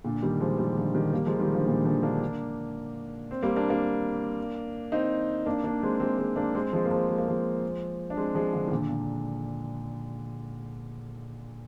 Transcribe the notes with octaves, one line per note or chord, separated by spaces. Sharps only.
A#2 D3
D#3 G3
F3 G#3
D#3 G3
D3 F3
D#3 G3
G3 A#3
F3 G#3
D#3 G3
D3 F3
A#2 D3
D3 F3
A#3 D4
C4
G3 A#3
A#3 D4
A#3 D4
C4 D#4
A#3 D4
A#3 D4
G#3 C4
G#3 C4
G#3 C4
A#3 D4
G#3 C4
F3 G#3
A#3
F3 G#3
G#3
A#3
F3 G#3
D4
G#3 C4
F3 G#3
D3 F3
D#3
A#2 D3
A#2